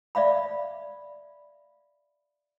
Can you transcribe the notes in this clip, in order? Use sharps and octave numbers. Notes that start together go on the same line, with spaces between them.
D5 E5 F5 B5